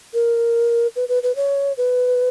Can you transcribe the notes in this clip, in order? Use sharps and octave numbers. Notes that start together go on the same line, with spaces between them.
A#4
B4
B4
B4
C#5
B4